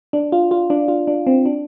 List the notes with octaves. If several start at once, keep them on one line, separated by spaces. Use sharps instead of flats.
D4
F4
F4
D4
F4
D4
C4
D4